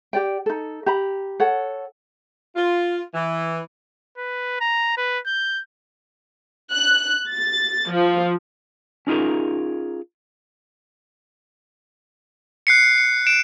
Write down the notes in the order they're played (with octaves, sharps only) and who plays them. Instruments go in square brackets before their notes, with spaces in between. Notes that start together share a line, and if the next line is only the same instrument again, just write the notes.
[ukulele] G4 D5 G5
D#4 A4
G4 A#5 B5
A4 C#5 F#5
[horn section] F4
E3
[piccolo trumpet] B4
A#5
B4
G6
[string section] F#6
A6
F3
[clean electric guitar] C#4 D#4 F4 G#4 A#4
[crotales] F#6 C7 C#7
C#7
D7 E7